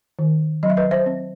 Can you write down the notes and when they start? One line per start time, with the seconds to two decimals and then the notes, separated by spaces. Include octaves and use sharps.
0.19 D#3
0.63 F#3 D#5
0.70 E5
0.77 B4 D#5
0.91 C5 E5
1.06 C4